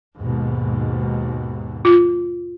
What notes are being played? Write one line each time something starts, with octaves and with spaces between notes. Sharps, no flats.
D#2 G#2 B2
F4